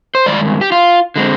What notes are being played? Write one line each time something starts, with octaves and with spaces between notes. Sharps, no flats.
C5
G2 D#3 G#3 D5
G4
F4
D3 G#3 C4